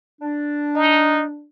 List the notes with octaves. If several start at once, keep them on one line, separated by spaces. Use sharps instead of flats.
D4
D#4